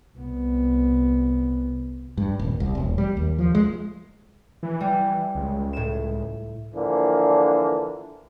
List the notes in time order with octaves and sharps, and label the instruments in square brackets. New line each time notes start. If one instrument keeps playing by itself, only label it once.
[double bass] C2 B3
[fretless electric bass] G2
D#1
C2
E1
G3
D#2
F3
G#3
[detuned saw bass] E3
[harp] G3
[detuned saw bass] C#2
[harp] A2 E7
[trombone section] D3 E3 F3 A#3 D4